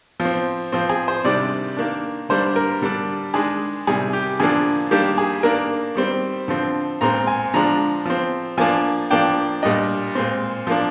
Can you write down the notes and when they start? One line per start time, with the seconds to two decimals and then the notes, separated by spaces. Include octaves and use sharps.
0.20 F3
0.25 C4
0.72 F3 C4
0.89 G#4
1.08 C5
1.24 C3 D#3 G3 D4 D5
1.77 D#3 A#3 D4
2.29 D3 G3 A#3 D4 C5
2.56 A#4
2.82 D3 G3 D4
3.34 D#3 G#3 D4 G#4
3.87 C3 D#3 G3 G#4
4.13 G4
4.40 D3 F3 A#3 D4 G#4
4.91 D#3 G3 A#3 D4 G4
5.18 G#4
5.43 D#3 A#3 D4 A#4
5.96 D#3 G3 C4
6.48 D3 F3 C4
7.01 A#2 G#3 C4 A#5
7.27 G#5
7.54 D3 F3 G#3 D4 A#5
8.06 F3 C4
8.58 F3 A#3 D4 G#5
9.11 F3 A#3 D4 G5
9.62 A#2 G3 D4 D#5
10.15 A#2 G#3 C4
10.67 F3 A#3 D4